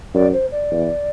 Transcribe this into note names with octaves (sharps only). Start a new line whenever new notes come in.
F#2 D5
C5
D5
E2